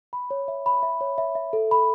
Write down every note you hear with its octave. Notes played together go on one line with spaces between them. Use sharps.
B5
C#5
E5
B5
E5
C#5
E5
E5
A4
B5